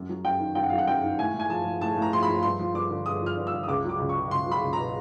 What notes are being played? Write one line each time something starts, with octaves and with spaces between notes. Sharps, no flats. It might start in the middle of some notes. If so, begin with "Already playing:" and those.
Already playing: F#2
F#3
F#2 G5
D#3
F#2 G5
F#5
F#3 F5
F#5
F#2 G5
D#3
A2 G#5
A2
G#5
F3 A5
F3
A2 A5
A2
A#5
F3 C6
B5
F3
G2 C6
F3
G2 D6
D3
G2 D#6
F3 F6
G2
E6
D3
D#6
C#2 D6
F#3 D6
C#2
C#6
B2
C#2 C6
F#3
B5
C#2
A#5
B2